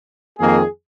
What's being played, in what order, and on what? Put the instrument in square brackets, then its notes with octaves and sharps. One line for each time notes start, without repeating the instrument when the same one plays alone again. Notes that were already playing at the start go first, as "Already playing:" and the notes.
[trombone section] F2 D#3 A#3 G#4